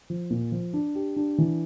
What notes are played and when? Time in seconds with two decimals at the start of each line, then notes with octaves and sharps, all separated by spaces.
0.10 F3
0.30 A#2
0.52 F3
0.74 D4
0.95 G4
1.16 D4
1.38 E3